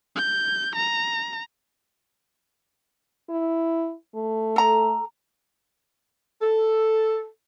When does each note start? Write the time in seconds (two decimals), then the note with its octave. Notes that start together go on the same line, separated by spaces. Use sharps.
0.16 G6
0.76 A#5
3.29 E4
4.15 A3
4.56 A4 A#5
6.41 A4